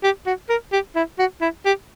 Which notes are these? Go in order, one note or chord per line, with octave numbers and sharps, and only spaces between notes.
G4
F#4
A#4
G4
E4
F#4
E4
G4